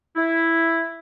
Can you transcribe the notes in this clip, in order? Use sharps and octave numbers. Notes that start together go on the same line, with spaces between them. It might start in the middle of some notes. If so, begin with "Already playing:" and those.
E4